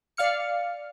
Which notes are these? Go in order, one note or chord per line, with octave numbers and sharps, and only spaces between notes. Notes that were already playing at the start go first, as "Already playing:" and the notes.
D5 F5 F6 C#7